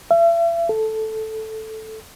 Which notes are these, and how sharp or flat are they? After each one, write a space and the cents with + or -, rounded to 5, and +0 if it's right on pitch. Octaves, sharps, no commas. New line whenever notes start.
E5 +40
A4 -5